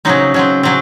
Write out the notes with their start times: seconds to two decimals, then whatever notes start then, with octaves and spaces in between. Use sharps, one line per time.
0.05 C#3 F#3 C4 D#4
0.34 C#3 F#3 C4
0.63 C#3 F#3 C4